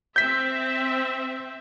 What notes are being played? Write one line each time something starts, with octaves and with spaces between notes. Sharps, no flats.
C4 E5 G6 B6